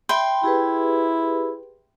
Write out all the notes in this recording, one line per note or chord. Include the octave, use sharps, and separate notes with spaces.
E5 G5 B5 C6
E4 G4 G#4 B4